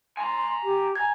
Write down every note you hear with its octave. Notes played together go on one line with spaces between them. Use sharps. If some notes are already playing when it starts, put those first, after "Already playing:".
G#5 A#5 C6
G4
G#5 A#5 G#6